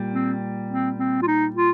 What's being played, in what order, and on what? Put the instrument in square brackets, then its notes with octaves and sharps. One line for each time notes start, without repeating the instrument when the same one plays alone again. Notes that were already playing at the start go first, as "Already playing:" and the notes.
Already playing: [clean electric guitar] A#2 G3
[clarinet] C4
C4
C4
F4
D#4
F4